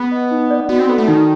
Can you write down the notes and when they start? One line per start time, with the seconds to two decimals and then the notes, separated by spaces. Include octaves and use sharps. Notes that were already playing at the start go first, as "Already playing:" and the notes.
Already playing: B3 G#4 B4 F#5
0.12 D#5
0.31 D#4
0.50 D5
0.69 B3 F#4
0.79 C4
0.89 B3 A4
0.98 A3
1.08 D#3 D#4